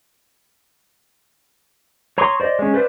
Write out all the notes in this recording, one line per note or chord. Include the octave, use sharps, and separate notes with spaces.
C#5 A#5 C6 C#6 D#6
C5 D5 D#5
G#3 C#4
B4 C5 D5 E5